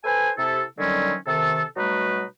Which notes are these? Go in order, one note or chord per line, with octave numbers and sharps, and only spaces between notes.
A4 B4 C5 G#5
C3 E4 A4
D3 D#3 F#3 G3 C4 C#4
C3 D#3 A4
B2 F#3 G3 A3 D#4 B4